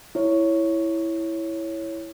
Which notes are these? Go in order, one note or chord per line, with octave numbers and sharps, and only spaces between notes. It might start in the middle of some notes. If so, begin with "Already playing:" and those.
E4 C#5